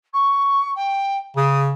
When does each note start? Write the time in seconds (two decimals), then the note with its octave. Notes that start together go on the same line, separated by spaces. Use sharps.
0.13 C#6
0.75 G5
1.37 C#3 D#6